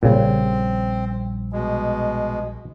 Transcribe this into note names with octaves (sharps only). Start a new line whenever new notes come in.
A#1 A#2 C#3 G3 C4 C#4
B2 G#3